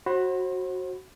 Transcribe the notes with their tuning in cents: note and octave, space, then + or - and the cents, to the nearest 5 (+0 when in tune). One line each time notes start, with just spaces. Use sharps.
F#4 +0 C5 +40 B5 +15